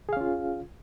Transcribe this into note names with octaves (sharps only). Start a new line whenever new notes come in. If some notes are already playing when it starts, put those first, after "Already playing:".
C#4 F4 G#4 F5